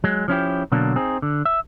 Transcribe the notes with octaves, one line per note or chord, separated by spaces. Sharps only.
F#3 G#3
F3 C#4 E4 G4
B2 D3 F#3 A#3 D4
C4 D#4 G#4
D3
E5